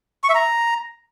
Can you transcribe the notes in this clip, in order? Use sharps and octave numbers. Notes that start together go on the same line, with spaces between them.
C#6
E5
A#5